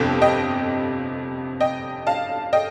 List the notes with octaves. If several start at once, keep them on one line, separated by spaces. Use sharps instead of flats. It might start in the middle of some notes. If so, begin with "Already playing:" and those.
Already playing: G1 F2 C3 G5
D#5 G5
D#5 G5
F5 A5
D#5 G5